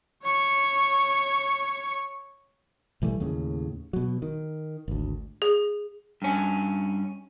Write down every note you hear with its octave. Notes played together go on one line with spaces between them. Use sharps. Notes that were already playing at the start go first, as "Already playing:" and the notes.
C#5 C#6
B1 E3 G3 A3
D#2 A2 C#3
B2 F#3
D#3
G#1 D2
G#4
G2 C#4